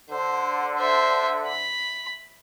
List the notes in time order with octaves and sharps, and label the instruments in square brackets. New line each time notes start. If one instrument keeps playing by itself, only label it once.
[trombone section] D3 [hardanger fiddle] C5
[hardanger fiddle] C5 E5
B5